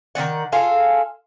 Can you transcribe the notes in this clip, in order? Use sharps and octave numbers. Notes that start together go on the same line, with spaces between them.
D#3 C4 D5 F#5
F4 G#4 A4 F5